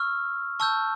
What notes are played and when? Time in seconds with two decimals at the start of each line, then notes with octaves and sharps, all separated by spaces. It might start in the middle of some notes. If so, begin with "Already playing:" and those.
Already playing: C#6 E6 F6
0.60 A5 C#6 E6 G6